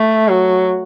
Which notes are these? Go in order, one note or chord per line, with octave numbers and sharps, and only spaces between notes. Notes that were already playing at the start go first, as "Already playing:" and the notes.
Already playing: A3
F#3